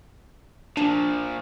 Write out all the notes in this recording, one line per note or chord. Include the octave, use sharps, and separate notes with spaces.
A#2 F3 D4